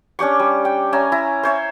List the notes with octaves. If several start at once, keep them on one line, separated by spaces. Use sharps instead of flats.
C#4 D4 G4 C#6
G3
G5
C#4 E5 G#5 A#5
E4 A#5
C5 C#5 E5